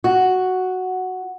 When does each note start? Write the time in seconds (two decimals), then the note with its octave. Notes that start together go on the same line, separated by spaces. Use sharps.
0.04 F#4